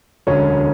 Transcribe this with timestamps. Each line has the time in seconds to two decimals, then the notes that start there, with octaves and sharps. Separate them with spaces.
0.27 E1 D2 D3 F#3 C#4 C#5